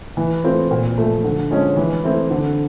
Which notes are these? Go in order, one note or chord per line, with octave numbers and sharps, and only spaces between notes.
E3
A3 C4 F4
A#2
F3 A3
D3
F3 G#3 C#4
E3
A3 C4 E4
D3